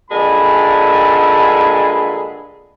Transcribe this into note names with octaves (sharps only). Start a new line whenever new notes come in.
G2 A#2 D3 G#3 A5 B5